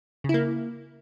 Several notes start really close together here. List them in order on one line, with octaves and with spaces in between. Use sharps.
C#3 E4 A#3